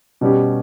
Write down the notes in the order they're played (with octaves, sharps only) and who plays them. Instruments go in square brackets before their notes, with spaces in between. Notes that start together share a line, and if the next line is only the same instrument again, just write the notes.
[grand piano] B2 G3 C#4 G4